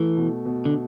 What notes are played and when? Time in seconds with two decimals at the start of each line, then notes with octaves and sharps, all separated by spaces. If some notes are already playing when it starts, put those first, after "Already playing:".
Already playing: E3 A3
0.17 B2
0.45 B2
0.65 D3